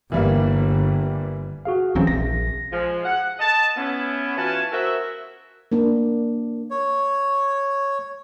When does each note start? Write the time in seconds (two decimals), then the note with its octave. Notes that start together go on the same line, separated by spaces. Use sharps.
0.12 G1 E3 G3 A#3
1.65 F#4 G#4 F5
1.95 D1 E3 F#3 C4 C#4 G#4
2.07 A#1 A#6
2.73 F3 G#3
3.05 F#5
3.39 D#5 A5
3.76 B3 C#4 E4
4.37 E3 C#4 F4 F#4 G#5 A5
4.72 F#4 A#4 C5 E5
5.72 A#3 D4
6.71 C#5